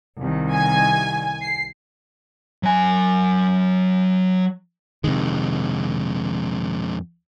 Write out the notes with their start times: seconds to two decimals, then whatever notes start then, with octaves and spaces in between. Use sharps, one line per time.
0.19 C2 D#3
0.54 G#5
1.41 C7
2.63 F#3 G#5
5.04 F2 C3 D#3 G#3